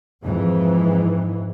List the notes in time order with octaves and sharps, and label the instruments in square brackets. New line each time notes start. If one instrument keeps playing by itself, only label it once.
[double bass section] F2 G#2 E3